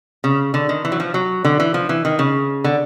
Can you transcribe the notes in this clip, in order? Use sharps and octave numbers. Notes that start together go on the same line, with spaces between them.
C#3
D3
D#3
E3
F#3
F3
F#3
D3
E3
F3
E3
D#3
C#3
D3